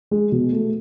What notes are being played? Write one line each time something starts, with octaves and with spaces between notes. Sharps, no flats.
G#3
B2
A3